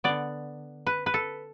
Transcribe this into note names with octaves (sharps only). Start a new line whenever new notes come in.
D3 B3 D5
B4
B4
A4